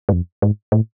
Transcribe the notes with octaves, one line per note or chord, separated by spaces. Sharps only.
G#2
F2
G#2
A2